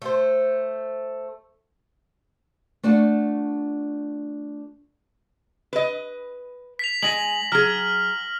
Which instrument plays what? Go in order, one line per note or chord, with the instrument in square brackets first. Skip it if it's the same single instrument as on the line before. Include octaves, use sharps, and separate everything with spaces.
[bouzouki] A3 C5
[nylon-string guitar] A3 D4 F4 F#4
[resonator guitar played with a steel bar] B4 D#5
[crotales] B6 F7
[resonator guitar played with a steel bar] G#3 G#5 [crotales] A#6 F#7
[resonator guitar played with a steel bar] F#3 G#4 [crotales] F6